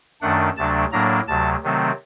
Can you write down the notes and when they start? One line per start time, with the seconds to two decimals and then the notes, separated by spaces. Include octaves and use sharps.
0.21 F#2 D#3 A3 D4 F#5
0.57 D2 C3 F#3 A3 D4 A5
0.92 A2 F#3 A#3 D4 A#5
1.27 D2 C3 F#3 A5
1.63 C3 D#3 F#3 A3 C4